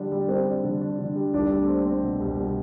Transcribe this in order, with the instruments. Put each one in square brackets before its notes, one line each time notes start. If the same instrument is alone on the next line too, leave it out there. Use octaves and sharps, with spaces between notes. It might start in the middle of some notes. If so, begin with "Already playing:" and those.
Already playing: [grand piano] D3 G3 D4
G3
[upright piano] C4 [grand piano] D4
[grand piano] G3
D3
D4
D3
G3
[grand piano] C2 [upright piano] D4
[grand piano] A3
C4
C4
B2
C2
B2